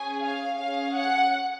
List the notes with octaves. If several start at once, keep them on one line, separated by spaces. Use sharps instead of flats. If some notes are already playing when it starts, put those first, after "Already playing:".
Already playing: C#4 G#4 G#5
F5
C#4 G#4 F5
F#5